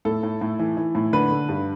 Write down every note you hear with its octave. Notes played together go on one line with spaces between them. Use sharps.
A2 A4
A2
A2
E3
E3
A2
D3 B4
D3
G2